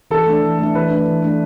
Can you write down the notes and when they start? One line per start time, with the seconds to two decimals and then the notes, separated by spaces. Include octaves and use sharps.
0.11 E3 A4
0.27 A3 D4
0.42 E3
0.59 A3 D4
0.75 E3 B4
0.91 A3 D4
1.06 E3
1.22 A3 D4